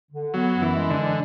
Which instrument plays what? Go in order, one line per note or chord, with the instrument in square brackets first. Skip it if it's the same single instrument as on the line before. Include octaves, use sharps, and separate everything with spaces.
[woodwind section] D3
[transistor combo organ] F#3 [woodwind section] B3
[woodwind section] F#2
[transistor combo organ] E3
[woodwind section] G#3
[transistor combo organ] D3
[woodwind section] E3